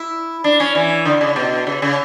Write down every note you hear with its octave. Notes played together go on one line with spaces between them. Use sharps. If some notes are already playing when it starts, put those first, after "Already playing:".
Already playing: E4
D4
C#4
E3
D3
C#3
B2
C#3
C#3